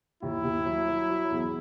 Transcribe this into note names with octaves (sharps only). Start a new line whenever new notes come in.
D#2 E4
D#2
F#3
F#3
F#3
E2